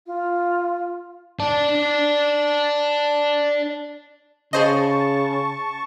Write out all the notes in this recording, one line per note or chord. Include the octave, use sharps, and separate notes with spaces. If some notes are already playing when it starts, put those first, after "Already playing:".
F4
D5 A5
C#3 G#4 C5 D#5 A5 C#6